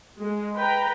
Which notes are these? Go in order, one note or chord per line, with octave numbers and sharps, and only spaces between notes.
G#3
B4 G5 A#5